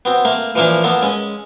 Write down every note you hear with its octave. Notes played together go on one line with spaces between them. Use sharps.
B3 C4 F#4
A3 A#3
E3 F3 A3 A#3 C#4 D4
A#3 B3 A4
G#3 C#4